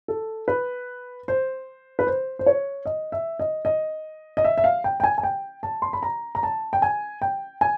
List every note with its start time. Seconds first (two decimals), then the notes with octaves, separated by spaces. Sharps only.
0.08 A4
0.48 B4
1.28 C5
1.99 B4
2.07 C5
2.39 C5
2.46 C#5
2.86 D#5
3.12 E5
3.39 D#5
3.65 D#5
4.37 D#5
4.44 E5
4.58 E5
4.64 F5
4.84 G5
5.00 G5
5.04 G#5
5.18 G#5
5.23 G5
5.63 A5
5.82 C6
5.93 B5
6.03 A#5
6.35 A#5
6.43 A5
6.73 G5
6.82 G#5
7.22 G5
7.61 G#5